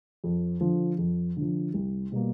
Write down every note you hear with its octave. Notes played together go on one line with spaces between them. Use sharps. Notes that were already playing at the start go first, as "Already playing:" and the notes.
F2
D3 F3
F2
D3 F3
C2
B2 G3 A#3